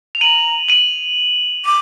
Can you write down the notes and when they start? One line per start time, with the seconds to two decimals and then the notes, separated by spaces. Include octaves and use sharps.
0.15 F7
0.21 A#5 D#7 F#7
0.68 D#7 F#7
1.65 D6 D#7 F#7